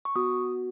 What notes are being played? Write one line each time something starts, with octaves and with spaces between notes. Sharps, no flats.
C#6
B3 F#4 D#6